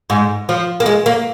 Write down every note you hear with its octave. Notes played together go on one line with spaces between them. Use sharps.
G#2
F3
A#3
G#3
A#3